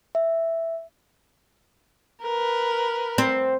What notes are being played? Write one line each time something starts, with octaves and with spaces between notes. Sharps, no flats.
E5
A#4 B4
C4